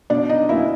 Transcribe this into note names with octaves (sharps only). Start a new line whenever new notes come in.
B2 D4 D5
D#4 D#5
F#3 A#3 C#4 E4 E5